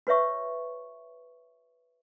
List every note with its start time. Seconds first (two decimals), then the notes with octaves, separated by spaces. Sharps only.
0.07 F#4 B4 C#5 E5 C#6